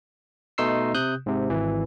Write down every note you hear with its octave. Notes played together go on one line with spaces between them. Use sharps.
B2 A3 D#4 C6 E6 C7
C3 D#6 F#6 G6
G#2 C3
G#1 E3